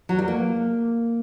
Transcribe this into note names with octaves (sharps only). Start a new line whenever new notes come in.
F#3
G3
A#3